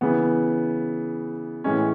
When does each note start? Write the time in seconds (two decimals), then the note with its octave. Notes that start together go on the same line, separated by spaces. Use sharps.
0.01 C#3 E3 B3
1.64 A2 E3 G#3 C#4